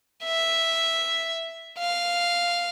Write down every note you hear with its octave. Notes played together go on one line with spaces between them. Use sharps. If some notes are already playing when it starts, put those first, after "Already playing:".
E5
F5